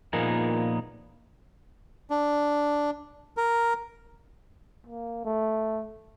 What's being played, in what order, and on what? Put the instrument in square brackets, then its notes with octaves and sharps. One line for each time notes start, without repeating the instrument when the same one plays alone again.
[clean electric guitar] A#2 F3 A#3 B3 D#4 G#4
[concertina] D4
A#4
[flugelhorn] A#3
A3